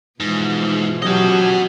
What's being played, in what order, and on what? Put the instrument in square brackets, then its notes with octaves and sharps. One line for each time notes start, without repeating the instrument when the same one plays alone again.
[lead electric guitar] G#2 [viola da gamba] B2 E3 F3
[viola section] F#3 C#4 G4 [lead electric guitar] F#4 D#5